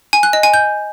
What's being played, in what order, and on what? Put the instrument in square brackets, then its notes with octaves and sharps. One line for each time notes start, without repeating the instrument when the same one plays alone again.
[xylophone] G#5
F#6
D#5
G#5
G6